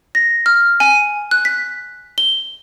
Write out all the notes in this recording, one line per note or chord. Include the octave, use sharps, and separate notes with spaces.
A#6
F6
G#5
F#6
B6
G7